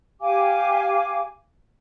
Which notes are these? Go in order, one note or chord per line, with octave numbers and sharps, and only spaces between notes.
G4 F5 G#5 D6